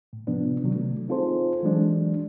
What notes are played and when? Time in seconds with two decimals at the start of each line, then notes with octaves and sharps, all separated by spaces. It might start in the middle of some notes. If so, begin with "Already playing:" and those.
0.13 A2
0.27 C3 F3 B3 D4
0.63 C3 D#3 F#3
0.75 A3
1.08 C4 D#4 F4 G#4 A4 C5
1.63 E3 F#3 G#3 D4